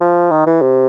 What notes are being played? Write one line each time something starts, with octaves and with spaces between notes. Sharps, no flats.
F3
D#3
E3
C3